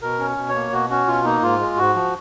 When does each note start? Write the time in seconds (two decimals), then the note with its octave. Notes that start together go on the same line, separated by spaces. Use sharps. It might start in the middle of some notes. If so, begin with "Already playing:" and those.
0.02 B2 A#4
0.19 C#4
0.37 B2
0.49 C#5
0.55 A#3
0.72 B2 F#4
0.90 C#4 F#4
1.07 B2 F4
1.25 A#3 D#4
1.42 G#2 F4
1.60 G#3
1.77 G#2 F#4
1.94 F3